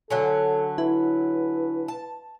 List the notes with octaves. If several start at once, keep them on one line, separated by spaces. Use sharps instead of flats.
D3 F#3 C#4 A4
E4 B4
A5